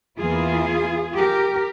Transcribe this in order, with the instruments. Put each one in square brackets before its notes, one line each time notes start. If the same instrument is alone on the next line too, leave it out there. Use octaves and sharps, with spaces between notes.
[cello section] E2 E3 A#3 E4 F4 G#4
G4 A#4